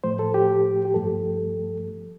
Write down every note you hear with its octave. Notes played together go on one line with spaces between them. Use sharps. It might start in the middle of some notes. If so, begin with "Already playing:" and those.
A2 F3 A3 C5
A4
G4
G4
G2 F3 A3 A4